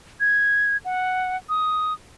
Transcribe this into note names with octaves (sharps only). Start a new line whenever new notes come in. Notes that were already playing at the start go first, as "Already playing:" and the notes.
G#6
F#5
D#6